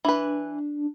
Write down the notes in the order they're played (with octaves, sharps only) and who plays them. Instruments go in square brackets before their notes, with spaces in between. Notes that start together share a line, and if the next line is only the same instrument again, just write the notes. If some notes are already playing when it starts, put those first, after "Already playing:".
[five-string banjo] E3 B4 [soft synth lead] D4